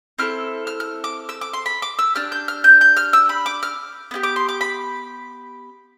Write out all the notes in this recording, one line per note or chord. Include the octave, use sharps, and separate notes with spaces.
C4 E4 A4 F6
F6
F6
D6
E6
D6
C6
B5
D6
E6
D4 G4 F6
G6
F6
G6
G6
F6
E6
B5
D6
F6
B3 E4 G4
D6
C6
D6
B5